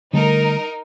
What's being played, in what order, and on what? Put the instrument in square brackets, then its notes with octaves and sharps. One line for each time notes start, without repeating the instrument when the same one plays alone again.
[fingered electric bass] D3 G3 A3 [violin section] D#4 A#4